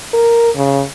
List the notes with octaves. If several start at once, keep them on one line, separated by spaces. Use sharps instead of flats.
A#4
C#3